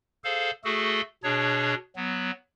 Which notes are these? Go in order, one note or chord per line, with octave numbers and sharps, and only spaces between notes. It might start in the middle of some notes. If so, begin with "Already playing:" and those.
G#4 A4 C5 F5
A3 F#4 G#4 A4
B2 D4 G#4 C#5
F#3 B3